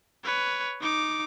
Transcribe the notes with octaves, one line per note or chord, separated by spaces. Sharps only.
B4 C#5
D#4 D6